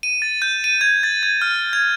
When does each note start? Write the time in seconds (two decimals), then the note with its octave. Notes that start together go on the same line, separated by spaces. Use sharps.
0.03 D#7
0.22 A6
0.42 G6
0.64 D#7
0.81 G#6
1.03 A6
1.23 G#6
1.42 F6
1.73 G#6